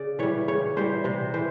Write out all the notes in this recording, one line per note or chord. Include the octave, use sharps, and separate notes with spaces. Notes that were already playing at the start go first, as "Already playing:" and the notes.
Already playing: C#3 D5
E3 G3 C#5
C#3 C#5
E3 G3 C5
C3 C5
E3 C5